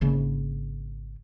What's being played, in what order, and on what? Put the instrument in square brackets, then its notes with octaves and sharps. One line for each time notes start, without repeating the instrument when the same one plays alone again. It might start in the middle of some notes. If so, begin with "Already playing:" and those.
[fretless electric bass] G#1 C#3 A#3